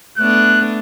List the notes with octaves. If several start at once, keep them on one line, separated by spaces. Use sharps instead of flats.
A3 B3 D4 F#6